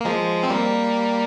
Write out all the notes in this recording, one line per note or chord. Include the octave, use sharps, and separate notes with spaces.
A#3
F3 G#3
C4
G3 A#3